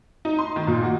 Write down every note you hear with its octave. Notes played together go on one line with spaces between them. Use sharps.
D#4
C6
D#3
A#2
F#4